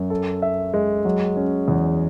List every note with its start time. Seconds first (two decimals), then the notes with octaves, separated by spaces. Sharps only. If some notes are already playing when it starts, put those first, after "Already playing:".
Already playing: F#2
0.10 A4
0.42 E5
0.74 G#3
1.05 F#3
1.37 C#4
1.68 E2